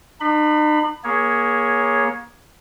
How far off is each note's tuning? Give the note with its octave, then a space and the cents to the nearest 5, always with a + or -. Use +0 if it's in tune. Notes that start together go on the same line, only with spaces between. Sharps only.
D#4 -45 B5 +5
A#3 +25 G#4 +0 C#5 +5